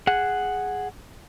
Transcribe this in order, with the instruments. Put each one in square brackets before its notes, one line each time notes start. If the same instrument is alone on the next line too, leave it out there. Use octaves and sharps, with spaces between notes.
[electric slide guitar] G#4 F#5